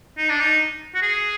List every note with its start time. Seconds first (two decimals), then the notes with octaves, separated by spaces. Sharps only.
0.18 D#4
0.29 D4
0.40 D#4
0.95 F#4
1.02 G#4